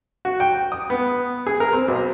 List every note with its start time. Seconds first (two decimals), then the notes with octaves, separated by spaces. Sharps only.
0.25 F#4
0.40 G5
0.72 D#6
0.90 B3
1.47 G#4
1.60 A#4
1.73 C4
1.88 B1